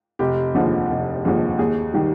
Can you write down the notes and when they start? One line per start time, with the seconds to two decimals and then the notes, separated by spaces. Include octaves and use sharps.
0.19 F1 G4
0.54 D#2 D3 F3 G#3
0.90 F1
1.25 D#2 D3 F3 G#3
1.59 D#2 G#4
1.94 D#3 G3